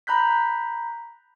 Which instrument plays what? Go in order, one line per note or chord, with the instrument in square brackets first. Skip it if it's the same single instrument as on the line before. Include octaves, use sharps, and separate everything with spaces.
[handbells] A#5 B5 F#6 G6 B6